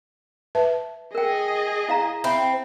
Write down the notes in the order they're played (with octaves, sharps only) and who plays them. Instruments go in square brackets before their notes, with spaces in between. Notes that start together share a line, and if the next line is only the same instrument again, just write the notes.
[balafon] B4 E5 A5
[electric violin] G#4 D#5 [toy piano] A#4 G5
[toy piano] E4 F5 A#5
[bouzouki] C4 [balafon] E5 B5